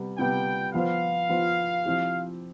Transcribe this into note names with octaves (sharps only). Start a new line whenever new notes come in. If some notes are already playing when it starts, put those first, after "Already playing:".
Already playing: C3 G3 B3
C3 G3 B3 G5
F3 B3 F4 C5 F5
F3 B3 F4 C5
F3 C4 E4 G4